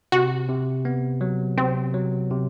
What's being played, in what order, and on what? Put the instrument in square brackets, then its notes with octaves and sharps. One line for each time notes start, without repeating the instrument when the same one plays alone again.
[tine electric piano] C3 [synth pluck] F#4
[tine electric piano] C3
B3
F#3
[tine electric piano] C3 [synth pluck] C4
[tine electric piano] F#3
C3